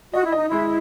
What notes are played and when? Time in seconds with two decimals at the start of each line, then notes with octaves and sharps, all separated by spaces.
0.13 F#4 D#5
0.24 E4
0.32 D#4 D#5
0.48 G#3 E4